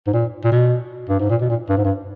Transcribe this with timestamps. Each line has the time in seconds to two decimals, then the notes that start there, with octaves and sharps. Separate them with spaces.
0.07 G#2
0.13 A#2
0.44 A#2
0.52 B2
1.09 G2
1.20 G#2
1.30 A#2
1.41 B2
1.50 A#2
1.69 G2
1.77 G#2
1.85 G2